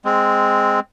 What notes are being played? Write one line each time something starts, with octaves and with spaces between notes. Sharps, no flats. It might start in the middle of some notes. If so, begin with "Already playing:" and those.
G#3 C4